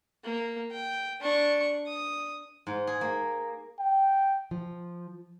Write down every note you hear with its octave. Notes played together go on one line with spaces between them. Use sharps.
A#3
G5
D4 C#6
D#6
G#2
G#4
A#3
G5
F3